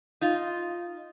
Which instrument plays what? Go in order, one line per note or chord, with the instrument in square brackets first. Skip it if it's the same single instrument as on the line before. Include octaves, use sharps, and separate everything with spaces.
[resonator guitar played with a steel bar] D#4 F4